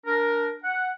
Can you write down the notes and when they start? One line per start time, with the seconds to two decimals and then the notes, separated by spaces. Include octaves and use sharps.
0.06 D4 A#4
0.64 F#5